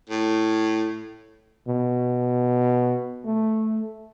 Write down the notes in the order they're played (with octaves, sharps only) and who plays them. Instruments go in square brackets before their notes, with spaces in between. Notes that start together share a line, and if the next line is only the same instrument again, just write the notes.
[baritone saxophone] A2
[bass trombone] B2
A3